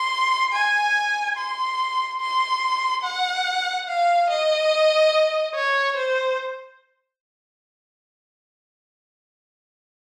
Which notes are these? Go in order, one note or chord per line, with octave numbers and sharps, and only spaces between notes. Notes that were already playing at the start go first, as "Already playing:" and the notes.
Already playing: C6
G#5
C6
C6
F#5
F5
D#5
C#5
C5